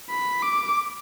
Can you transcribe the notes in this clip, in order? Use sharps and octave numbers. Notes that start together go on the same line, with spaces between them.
B5
D6